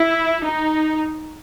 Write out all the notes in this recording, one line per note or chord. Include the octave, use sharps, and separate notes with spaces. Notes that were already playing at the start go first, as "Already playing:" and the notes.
Already playing: E4
D#4